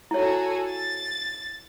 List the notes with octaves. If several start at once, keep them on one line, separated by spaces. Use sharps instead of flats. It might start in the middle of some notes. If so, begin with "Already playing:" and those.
E4 F#4 G#4 A4 C#5
A6